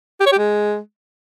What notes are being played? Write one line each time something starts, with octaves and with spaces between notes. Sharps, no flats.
G4
C#5
G4
G#3